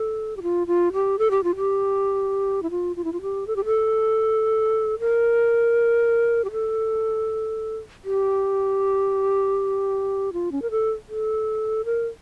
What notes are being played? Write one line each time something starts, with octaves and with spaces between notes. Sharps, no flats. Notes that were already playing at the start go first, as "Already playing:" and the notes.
Already playing: A4
G4
F4
F4
G4
A4
G4
F4
G4
E4
F4
F4
E4
F4
G4
A4
G4
A4
A#4
G4
A4
G4
F4
C#4
A#4
A4
A4
A#4